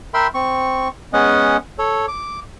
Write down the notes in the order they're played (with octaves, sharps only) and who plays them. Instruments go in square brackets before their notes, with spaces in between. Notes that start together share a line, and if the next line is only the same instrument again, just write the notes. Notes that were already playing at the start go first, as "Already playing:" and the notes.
[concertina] A#4 E5 G5 B5 C6
C4 C#6
G#3 B3 C#4 D#5 F#5
A4 C#5
D6